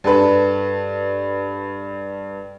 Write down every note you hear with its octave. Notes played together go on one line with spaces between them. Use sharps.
G2 A4 B4